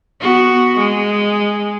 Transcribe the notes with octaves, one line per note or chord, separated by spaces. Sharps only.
B3 F#4
G#3